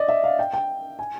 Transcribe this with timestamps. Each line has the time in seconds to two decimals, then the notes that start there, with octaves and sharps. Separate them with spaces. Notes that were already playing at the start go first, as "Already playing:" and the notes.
Already playing: D5 D#5
0.08 E5
0.24 F5
0.39 G5
0.54 G5
0.99 G#5